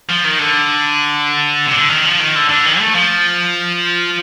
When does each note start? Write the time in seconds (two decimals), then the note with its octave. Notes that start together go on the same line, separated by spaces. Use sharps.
0.09 F3
0.24 D#3
0.39 D3
1.66 C3
1.74 D3
1.89 D#3
2.05 F3
2.20 D#3
2.35 D3
2.49 D3
2.65 D#3
2.79 A3
2.95 F3